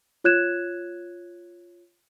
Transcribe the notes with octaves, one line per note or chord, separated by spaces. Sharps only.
F4 C#5 F#6 G#6 E7